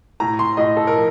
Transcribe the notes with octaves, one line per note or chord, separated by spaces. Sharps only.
A2 A#5
C6
A2 D#5
A4
A#4
F3